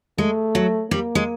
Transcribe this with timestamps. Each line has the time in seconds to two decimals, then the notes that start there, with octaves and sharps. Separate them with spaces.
0.18 G#3 A3
0.55 F#3
0.91 G3 A#3
1.15 G#3